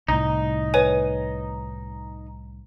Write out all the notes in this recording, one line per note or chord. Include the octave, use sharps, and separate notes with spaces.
C2 A2 D#4
B4 C#5 G#5